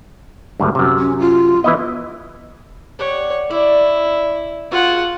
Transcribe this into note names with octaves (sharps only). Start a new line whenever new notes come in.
G#1 D2 G2
F#2 C3
C#4
F4
E3 B3 E4 D#5
G4 C#5 D5 F#5
E4 D5
F4 F#4 G#4 A#4 F#5